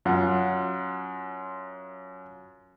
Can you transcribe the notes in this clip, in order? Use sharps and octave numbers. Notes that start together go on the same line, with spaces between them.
F#2 F4 F#5